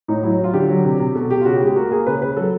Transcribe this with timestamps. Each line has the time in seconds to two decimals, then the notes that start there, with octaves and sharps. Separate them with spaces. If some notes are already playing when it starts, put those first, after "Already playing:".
0.08 A2 D#4
0.23 F#3 E4
0.38 F#3
0.44 F4
0.54 D3 G4
0.69 F#3
0.85 C3
1.00 C3
1.15 B2 A4
1.30 B2 G4
1.41 F4
1.45 C#3 F#4
1.55 G4
1.61 G#3
1.66 G4
1.76 A#3 F#4
1.91 A#3 G#4
2.06 C#3 B4
2.22 C#3 B4
2.36 F#3 A4